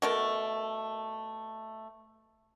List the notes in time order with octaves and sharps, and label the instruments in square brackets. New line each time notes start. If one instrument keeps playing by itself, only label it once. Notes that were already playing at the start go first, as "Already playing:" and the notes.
[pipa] B2 A3 A#4